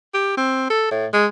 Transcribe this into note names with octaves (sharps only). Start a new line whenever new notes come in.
G4
C4
A4
A2
G#3